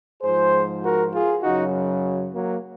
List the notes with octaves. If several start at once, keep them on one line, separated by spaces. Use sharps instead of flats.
G#2 F3 G#4 C5
F#4 A#4
F4 G#4
F#2 C#3 F#3 D#4 F#4
F#3 A#3